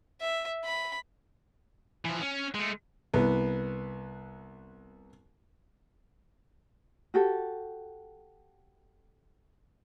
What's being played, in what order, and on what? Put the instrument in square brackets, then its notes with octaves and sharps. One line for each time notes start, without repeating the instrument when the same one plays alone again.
[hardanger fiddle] E5
B5
[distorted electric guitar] E3 F3
C#4
G#3 A3
[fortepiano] C2 B3
[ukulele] F#4 G4 A4